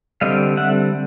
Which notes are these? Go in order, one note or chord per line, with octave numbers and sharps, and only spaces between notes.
D3 G3 C4 D#5 F5
E5 F#5